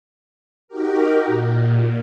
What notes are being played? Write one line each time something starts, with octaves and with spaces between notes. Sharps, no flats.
D#4 F#4 G4 A#4
A#2